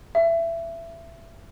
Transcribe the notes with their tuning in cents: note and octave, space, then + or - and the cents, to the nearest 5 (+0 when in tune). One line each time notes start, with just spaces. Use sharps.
E5 +20